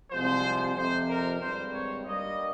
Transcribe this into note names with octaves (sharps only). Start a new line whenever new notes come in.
C2 C3 F3 G#3 C5
F2 C3 F3 C5
A#4
G#1 G2 G3 C5
C#5
G2 G3 A#3 D#5